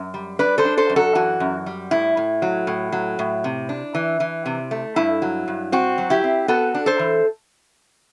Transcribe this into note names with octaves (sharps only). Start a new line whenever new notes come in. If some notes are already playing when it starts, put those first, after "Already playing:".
Already playing: F#2
G3
D4 B4 D5
A4 C5
D4
A4 C5
F#2
F#4 A4
E3 F#4
F#2
G3
A2 E4
A2
F#3
A2
F#3
A2
C3
D4
E3
E3
C3
A3
G2 E4
F#3
G2
C4 F#4
F#3
E4 G4
C4
B3 F#4 A4
D4
A4 C5
E3